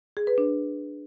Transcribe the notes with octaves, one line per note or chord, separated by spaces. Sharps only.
G#4
B4
D4